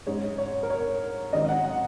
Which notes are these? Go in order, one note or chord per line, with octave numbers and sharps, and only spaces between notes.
G#2 G#3 C#4 C#5
C#5
A#4
C#5
G#1 G#2 F#3 C#4 D#5
F#5
F#5